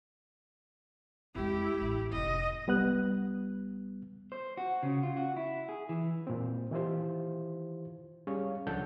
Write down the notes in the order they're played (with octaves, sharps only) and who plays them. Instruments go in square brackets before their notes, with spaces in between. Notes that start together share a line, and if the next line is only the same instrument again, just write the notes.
[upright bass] F2 G#3 [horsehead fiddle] E4 G4
[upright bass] A1
[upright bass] F1 C#4 [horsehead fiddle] D#5
[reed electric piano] C2 G3 B3 F#6
[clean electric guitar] C5
F#4
C#3
F4
F#4
E4
G#4
E3
[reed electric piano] A#2 C4
D#3 E3 E4 F4 G4 C5
G3 C#4 G#4 C#5 F5
C#2 F3 D4 A4 F#5 G6